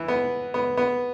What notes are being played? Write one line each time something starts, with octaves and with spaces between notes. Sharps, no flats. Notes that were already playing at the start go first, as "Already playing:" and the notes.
Already playing: E3
B3
B3
B3